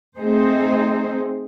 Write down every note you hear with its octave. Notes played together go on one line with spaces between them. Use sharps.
A3 C4 D#4 G#4 C5